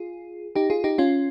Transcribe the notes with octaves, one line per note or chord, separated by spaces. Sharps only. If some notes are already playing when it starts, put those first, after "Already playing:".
Already playing: F4 G#4
D#4 G4
F4 G#4
D#4 G4
C#4 F4